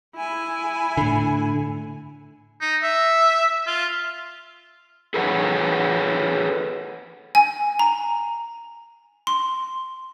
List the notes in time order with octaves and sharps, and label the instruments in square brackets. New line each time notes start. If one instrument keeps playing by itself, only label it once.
[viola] E4 G#5
[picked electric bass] A2 D3
[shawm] D#4
E5
F4
[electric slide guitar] G#4 A4 B4 C#5 F5 F#5
[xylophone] G#5
A#5
C6